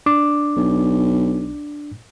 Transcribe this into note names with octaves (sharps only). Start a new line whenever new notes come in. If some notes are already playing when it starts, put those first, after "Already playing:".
D4 D6
B1